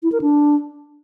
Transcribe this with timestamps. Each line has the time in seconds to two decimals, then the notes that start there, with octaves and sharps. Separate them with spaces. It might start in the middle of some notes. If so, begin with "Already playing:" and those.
0.03 E4
0.12 A#4
0.21 D4